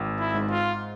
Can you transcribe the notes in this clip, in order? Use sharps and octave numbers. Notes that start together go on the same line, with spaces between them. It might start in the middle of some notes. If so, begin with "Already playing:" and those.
Already playing: G#1
E4
G#2
F4